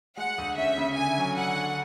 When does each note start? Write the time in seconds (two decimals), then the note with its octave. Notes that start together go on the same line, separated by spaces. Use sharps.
0.17 G#3 F#5
0.38 D2
0.57 C#4 E5
0.78 C#3
0.97 D3 G#5
1.18 F#3
1.38 D3 F#5
1.57 D3